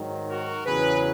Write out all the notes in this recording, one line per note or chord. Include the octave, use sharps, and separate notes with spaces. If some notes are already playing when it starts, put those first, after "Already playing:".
Already playing: G#2 D#3 F#3
F#4 A#4
E2 C#3 F#3 G#4 B4